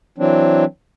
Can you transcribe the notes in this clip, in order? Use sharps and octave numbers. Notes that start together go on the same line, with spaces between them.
E3 F#3 C4 D4